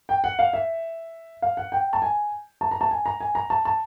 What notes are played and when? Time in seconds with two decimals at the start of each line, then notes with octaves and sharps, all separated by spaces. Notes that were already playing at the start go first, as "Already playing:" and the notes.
0.09 G5
0.24 F#5
0.39 F5
0.53 E5
1.42 F5
1.57 F#5
1.72 G5
1.93 A5
2.02 G#5
2.61 A5
2.71 A#5
2.81 A5
2.91 G#5
3.06 A#5
3.20 G#5
3.35 A#5
3.50 A5
3.65 A5